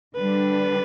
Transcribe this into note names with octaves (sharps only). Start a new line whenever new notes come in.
D3 G3 D4 B4